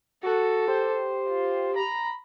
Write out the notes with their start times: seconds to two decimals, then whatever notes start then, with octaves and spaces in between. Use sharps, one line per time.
0.23 F#4 A4
0.68 G4 C5
1.29 F4
1.76 A#5 B5